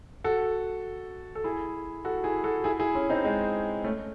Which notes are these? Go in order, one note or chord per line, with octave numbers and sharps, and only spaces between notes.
F#4 A4
A4
E4 G#4
F#4 A4
E4 G#4
F#4 A4
E4 G#4
E4 G#4
C#4 E4
C4 D#4
G#3 C4
A3 C#4